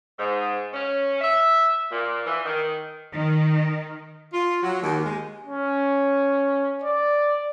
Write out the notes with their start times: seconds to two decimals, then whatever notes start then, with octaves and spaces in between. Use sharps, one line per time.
0.19 G#2
0.73 C#4
1.21 E5
1.91 A#2
2.26 E3
2.46 D#3
3.13 D#3
4.33 F4
4.63 F#3
4.82 D#2
5.05 G#3
5.46 C#4
6.83 D5